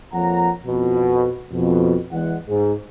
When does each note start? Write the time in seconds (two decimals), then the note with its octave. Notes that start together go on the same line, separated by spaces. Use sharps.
0.13 F2 F3 A#3 C#5 F#5 A#5
0.67 F2 B2
1.52 F2 B2
2.12 E2 G#3 F#5
2.48 G#2